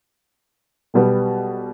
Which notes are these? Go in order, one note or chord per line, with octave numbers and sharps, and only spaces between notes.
B1 B2 G3 B3